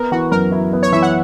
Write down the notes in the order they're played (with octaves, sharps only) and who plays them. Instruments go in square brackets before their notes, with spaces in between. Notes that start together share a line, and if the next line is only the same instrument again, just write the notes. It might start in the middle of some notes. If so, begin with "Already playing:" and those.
Already playing: [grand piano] B3 [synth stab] A#4
[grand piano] E3 [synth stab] F#4
[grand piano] F#2 [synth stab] A#4
[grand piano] E4
B3
[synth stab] C#5
[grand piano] E3 [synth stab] E5
[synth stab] F#5